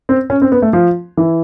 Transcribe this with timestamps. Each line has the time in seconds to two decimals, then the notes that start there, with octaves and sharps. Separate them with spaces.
0.09 C4
0.30 C#4
0.42 C4
0.52 B3
0.62 A3
0.73 F3
1.17 E3